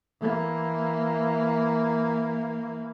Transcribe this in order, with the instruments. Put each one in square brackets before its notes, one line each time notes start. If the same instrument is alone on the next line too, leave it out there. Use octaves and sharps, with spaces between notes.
[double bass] E3 A#3